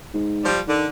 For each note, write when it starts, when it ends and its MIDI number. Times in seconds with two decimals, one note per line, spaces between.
0.14 0.47 44
0.44 0.59 53
0.44 0.59 55
0.67 0.87 50
0.67 0.86 51